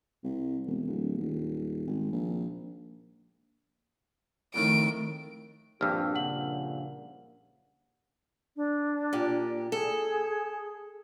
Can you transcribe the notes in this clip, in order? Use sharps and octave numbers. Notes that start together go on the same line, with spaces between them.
C2
E1
D1
D#1
G#1
A#1
F2 A2 D#3 D7
A#1 G2 C4 F4 G4 E6 F6
A#2 C#3 F#5 F#7
D4
A#2 G4
G#4 A4